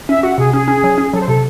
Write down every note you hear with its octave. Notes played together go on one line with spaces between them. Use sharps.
C#4 E5
F#4 F#5
C3 G#4
C#4 G#4
C#4
F#3
C#4
F#3 A4
C5
C3 A4